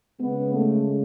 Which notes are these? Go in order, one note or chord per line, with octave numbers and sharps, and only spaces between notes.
C#3 G#3 B3
A3